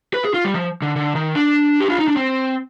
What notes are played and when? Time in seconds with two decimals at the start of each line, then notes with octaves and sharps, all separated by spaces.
0.14 B4
0.25 G#4
0.34 F4
0.44 G3
0.54 F3
0.82 D3
0.96 D3
1.15 D#3
1.35 D4
1.80 G4
1.90 F4
1.99 D#4
2.08 D4
2.17 C4